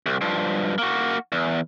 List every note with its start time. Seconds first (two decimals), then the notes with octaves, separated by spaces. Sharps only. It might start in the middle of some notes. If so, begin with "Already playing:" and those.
0.06 C2
0.21 G2 F3
0.78 A#3 F#4
1.32 E2